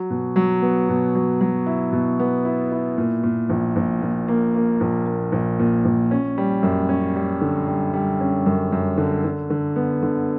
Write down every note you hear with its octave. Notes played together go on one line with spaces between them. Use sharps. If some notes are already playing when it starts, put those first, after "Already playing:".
Already playing: F#3
B2
F#3
B3
B2
F#3
F#3
E4
B2
B3
E4
E4
A#2
A#2
A#1
A#1
A#2
A#3
A#3
A#1
A#3
A#1
A#2
A#1
C#4
G3
F#2
C#4
G3
D3
G3
G3
C#4
F#2
F#2
D3
D3
D3
B3
D3